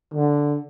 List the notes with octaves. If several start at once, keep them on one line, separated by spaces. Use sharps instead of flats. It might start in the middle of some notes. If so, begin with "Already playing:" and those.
D3